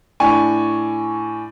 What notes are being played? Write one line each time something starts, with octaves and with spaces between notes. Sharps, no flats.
A2 D4 G#5 C#6